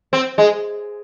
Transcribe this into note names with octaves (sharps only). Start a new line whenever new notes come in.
C4
G#3